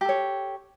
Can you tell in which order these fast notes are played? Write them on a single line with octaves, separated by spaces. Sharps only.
G4 A4 C#5